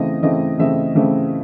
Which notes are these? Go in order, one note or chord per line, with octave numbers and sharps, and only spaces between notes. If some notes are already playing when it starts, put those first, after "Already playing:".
Already playing: C#3 E3 A3 C4 D#5
C#3 E3 A3 C4 D#5
C#3 E3 A3 C4 E5
C#3 E3 A3 C4